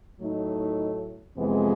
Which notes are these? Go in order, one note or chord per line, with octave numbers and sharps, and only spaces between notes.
A2 F#3 A3 D#4
F2 C3 E3 G#3 B3